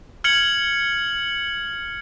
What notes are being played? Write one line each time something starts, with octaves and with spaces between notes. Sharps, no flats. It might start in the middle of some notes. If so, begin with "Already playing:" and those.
F6 G#6 C#7 F#7